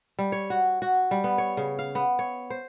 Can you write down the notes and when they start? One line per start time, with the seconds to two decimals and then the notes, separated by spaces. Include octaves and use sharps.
0.19 G3
0.32 C#5
0.50 F#4
0.82 F#4
1.11 G3
1.24 B3
1.38 C#5
1.57 C#3
1.79 F5
1.95 B3
2.19 C#5
2.50 C5